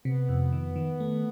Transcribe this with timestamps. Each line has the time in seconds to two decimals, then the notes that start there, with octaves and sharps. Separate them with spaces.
0.05 C3 B3
0.29 F2
0.52 D#3
0.76 D#3
1.00 A3